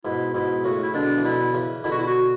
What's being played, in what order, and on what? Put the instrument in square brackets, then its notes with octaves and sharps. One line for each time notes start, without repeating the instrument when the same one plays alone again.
[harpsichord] G#2 B2 [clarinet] E4
[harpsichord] G#2 B2 [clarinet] E4
[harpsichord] A2 C#3 [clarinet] F#4
[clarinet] E4
[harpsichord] B2 D3 [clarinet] D4
[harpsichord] E3
[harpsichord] B2 D3 [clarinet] E4
[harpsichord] C#3 E3
[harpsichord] B2 D3 [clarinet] E4
[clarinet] F#4
E4
F#4